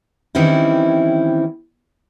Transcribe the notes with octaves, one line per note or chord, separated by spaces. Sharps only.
D#3 E3 G3 C4 C#4 E4